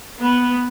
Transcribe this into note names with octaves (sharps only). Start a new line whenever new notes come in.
B3